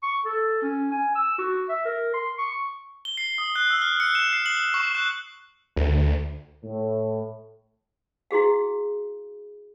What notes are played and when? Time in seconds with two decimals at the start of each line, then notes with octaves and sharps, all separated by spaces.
0.03 C#6
0.25 A4
0.62 C#4
0.91 G#5
1.15 E6
1.38 F#4
1.69 E5
1.85 A#4
2.14 C6
2.38 C#6
3.05 G7
3.17 C7
3.38 D#6
3.56 F#6
3.70 E6
3.82 F6
4.00 C#7
4.15 E7
4.33 C7
4.46 F#7
4.74 C#6
4.95 F#6
5.76 D2
6.64 A2
8.31 E4 F#4 G#4 F5